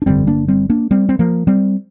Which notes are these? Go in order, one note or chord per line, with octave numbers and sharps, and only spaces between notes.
D4
G1 F2 D3 G3 C4
A#3 D4
G3 C4
A#3 D4
G3 C4
C4
F3 A#3
G3 C4